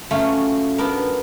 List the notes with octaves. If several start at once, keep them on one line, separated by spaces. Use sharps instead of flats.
F#3 A3 C#4 F4
B3 D4 A#4